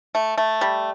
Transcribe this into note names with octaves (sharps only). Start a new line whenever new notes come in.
A3
A3
G3